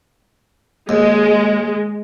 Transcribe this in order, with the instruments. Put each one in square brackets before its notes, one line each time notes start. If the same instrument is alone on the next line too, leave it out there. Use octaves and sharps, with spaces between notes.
[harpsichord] D#2 [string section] G#3